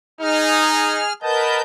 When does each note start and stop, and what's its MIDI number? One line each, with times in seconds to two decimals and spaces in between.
0.20 1.05 63
0.20 1.13 68
0.20 1.13 89
1.23 1.62 70
1.23 1.62 71
1.23 1.62 75
1.23 1.62 78
1.23 1.62 81
1.23 1.62 91